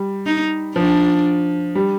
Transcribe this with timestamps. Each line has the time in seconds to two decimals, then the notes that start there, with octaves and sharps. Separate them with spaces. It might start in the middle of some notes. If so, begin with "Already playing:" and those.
Already playing: G3
0.26 D#4
0.76 F3 D4
1.75 G3